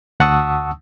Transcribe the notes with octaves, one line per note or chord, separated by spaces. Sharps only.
D2 F#5 A5 C#6 D#6 E6